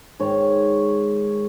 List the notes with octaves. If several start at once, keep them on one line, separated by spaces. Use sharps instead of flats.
G#2 D#3 C#5